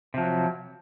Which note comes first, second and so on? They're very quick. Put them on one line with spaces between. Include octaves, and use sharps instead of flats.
C3 F3 F#3